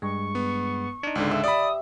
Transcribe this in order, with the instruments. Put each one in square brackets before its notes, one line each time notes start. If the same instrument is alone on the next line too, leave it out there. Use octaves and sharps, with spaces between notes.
[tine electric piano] G2 G#3 [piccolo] C#6
[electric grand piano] B3
[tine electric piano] D4 D#4
[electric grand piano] C#2 G#2 D3
[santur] E5
[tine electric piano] G4 [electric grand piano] D5 B5 [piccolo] D#6